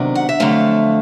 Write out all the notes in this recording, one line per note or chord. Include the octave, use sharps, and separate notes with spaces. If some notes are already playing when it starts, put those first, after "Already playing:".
Already playing: C3 D#3 F#3 B3 D4
F#5
E5
F2 D3 F#3 A3 F5